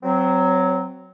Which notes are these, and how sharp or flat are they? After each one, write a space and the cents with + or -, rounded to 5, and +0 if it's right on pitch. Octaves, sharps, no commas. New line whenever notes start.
F#3 +5 C4 -20